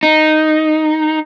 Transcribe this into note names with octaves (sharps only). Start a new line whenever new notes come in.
D#4